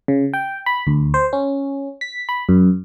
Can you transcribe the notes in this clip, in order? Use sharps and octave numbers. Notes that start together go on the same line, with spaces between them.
C#3
G5
B5
D2
C5
C#4
B6
B5
F#2